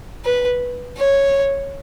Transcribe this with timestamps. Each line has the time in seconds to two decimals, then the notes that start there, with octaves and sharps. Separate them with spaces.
0.25 B4
0.97 C#5